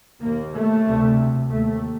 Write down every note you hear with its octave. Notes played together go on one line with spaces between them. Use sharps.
D#2 A#3
A3
D2 C3
D#2 A3